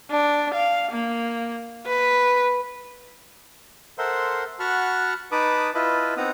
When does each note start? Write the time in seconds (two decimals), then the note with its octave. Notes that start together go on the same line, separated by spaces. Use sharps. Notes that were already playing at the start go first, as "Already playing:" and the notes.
0.11 D4
0.55 F5
0.91 A#3
1.87 B4
3.98 A4 A#4 C5 E5 F#5 C6
4.60 F#4 F#5 A5 B5 C#6 F6
5.32 D#4 B4 A5 B5 D6 D#6
5.74 E4 F4 B4 D#5 A5 B5
6.17 B3 C4 D#4 F#5 A#5 D#6